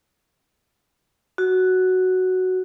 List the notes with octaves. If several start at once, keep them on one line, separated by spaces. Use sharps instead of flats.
F#4